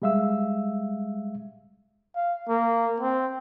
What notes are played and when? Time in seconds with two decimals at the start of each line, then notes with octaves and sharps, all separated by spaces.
0.02 G3 G#3 E5 F5 E6
2.16 F5
2.48 A#3
3.00 C4